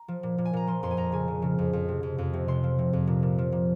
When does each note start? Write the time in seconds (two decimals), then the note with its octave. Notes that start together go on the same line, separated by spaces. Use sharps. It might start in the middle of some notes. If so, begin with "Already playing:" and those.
Already playing: A#5
0.08 F3
0.23 A#2
0.38 A#2
0.45 G#5
0.53 A#2 A#5
0.67 F3 C6
0.83 F2 C6
0.91 G#5
0.97 F2 A#5
1.12 C#3 G#5
1.28 F3
1.42 C#3
1.58 F2
1.73 F2
1.88 C3
2.03 F2
2.18 F2
2.33 C3
2.48 C3 C6
2.63 F3
2.78 C3
2.93 F2
3.07 A#2
3.23 A#2
3.38 F3
3.52 A#2